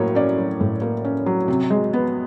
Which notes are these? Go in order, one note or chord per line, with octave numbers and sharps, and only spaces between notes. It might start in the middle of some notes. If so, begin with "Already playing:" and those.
Already playing: A2 F#3 A#3 C#5
C#4 D5
F#3
A2
A#3
C#4
F#3
C3
G#3
B3